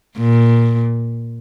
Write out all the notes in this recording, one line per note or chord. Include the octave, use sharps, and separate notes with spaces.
A#2